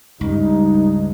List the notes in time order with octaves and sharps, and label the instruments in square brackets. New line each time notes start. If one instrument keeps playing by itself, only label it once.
[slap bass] C#2 [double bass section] G2 [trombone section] D#4